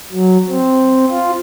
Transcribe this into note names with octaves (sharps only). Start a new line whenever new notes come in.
F#3
C4
F4